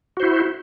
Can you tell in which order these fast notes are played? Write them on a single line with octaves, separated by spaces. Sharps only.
F#4 C5 E4